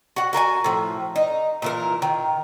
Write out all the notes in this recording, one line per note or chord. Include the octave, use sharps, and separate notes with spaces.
F#4 F#5
F#4 A#4 F#5 G#5
A2 F3
D#4
A#2 E3 A#4
D#3